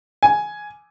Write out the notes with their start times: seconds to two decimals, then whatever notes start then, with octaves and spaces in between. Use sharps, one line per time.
0.23 G#5